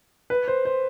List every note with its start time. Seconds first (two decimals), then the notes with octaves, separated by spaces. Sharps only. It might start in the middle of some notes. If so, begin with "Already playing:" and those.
0.30 B4
0.48 C5
0.65 C5